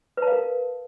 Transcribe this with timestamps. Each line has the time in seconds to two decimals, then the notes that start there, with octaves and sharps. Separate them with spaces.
0.17 B4
0.22 A5
0.27 F5
0.32 A#4